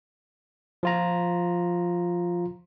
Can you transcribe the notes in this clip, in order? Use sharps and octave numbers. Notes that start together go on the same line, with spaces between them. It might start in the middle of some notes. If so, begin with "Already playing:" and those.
F3 F4 A#5